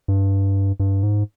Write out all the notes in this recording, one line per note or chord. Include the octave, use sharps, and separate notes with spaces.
G2
G2
G#2